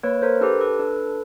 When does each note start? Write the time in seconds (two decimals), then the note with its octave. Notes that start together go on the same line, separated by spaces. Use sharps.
0.03 A#3 B4 C#5
0.22 A#4 C5
0.41 D4 G4 A4 B4
0.61 A4 B4
0.79 D4